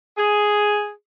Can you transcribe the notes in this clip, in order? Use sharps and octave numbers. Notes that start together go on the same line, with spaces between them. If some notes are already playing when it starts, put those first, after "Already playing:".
G#4